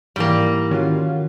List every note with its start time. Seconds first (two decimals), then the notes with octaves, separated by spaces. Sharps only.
0.16 G#2 E3 G3 A#3
0.71 D#3 C#4 F4 F#4